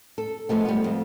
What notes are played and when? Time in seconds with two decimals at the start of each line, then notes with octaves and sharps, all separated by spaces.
0.18 A4
0.49 F3 G#3 A3 B3
0.65 G3 B3
0.84 F2